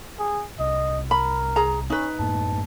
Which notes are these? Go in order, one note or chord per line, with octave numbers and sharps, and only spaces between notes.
G#4
C2 D#5
A#4 B5
G#4 A#5
C#4 D#4 B4
F#2 A2 A#3 A5